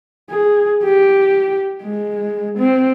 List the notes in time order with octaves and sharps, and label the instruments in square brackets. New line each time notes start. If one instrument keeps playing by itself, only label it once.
[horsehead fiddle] G#4
G4
G#3
C4